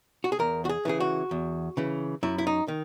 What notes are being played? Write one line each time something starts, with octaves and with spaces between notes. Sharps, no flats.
F#4
G#4
E2 A#4
F#4
G#4
C#3 E3 G#4
F#4
E2
C#3 E3
F#2 E4
E4
D#4
D#3